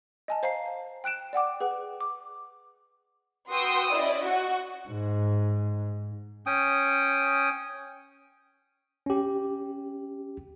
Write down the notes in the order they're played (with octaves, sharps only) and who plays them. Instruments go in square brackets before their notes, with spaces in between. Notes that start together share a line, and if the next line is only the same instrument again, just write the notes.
[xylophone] D#5 G#5 A5
C5 F5 A#5 C7
G5 F#6 D7 E7
D5 F#5 G5 D6
G#4 B4 F#5
D6
[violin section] F#4 B4 G5 C6 D#6 E6
C#4 E4 D5 D#5
F#4
[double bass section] G#2
[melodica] C#4 G5 D#6
[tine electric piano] C#4 G4